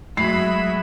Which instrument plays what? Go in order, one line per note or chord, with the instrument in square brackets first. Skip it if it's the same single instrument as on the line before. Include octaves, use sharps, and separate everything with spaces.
[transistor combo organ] F#3 G#3 [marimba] A3 F#4 [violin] E5 B5 [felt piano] C7